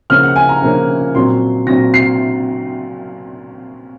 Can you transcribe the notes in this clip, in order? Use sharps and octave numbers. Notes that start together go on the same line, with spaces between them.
C#3 F3 A#3 C#4 F6
F#5
G#5
A#5
C#3 F3 A#3 C#4
A#2 F#3 C4 C6
A#2 F#3 C4 A#6
C7